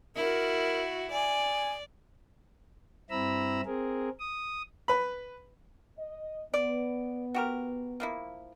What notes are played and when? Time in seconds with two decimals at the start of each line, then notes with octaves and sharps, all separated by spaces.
0.16 E4 F#4 A#4
1.11 D5 G#5
3.10 G2 C4 E4 A#5 B5 E6
3.65 C4 G#4 A#4
4.20 D#6
4.88 B4 B5
5.97 D#5
6.54 B3 D5
7.34 F#4 G4 A#4
8.00 F3 A#3 E4